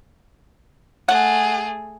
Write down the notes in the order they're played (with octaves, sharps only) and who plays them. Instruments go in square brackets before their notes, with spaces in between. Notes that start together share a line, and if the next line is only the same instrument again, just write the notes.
[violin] A3 G#4 [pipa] F#5